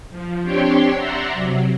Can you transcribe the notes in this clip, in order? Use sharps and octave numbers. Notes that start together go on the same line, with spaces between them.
F3
C4 D4 G4 C#5 G5 C6
D5 E5 F#5 A#5 C6
C3 F#3